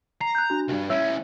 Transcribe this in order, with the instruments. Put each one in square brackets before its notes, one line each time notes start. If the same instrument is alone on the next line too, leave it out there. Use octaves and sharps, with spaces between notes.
[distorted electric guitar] A#5 [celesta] C7
[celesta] F#6 G6
D4 F#4
[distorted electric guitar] C2 G2
[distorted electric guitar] E3 C#4 [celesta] C#5 E5 E6